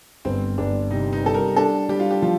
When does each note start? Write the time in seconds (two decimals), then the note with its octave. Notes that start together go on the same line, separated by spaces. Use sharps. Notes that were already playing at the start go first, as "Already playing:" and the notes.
0.25 G1 C4
0.58 G1 D4
0.91 C3 D#4
1.13 D#4
1.24 G3 A4
1.34 A#4
1.56 D4 A4
1.89 G3 G4
2.00 F4
2.11 G4
2.22 F3 F4